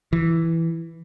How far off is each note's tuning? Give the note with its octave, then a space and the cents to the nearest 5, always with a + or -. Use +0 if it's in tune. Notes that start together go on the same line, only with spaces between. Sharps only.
E3 +0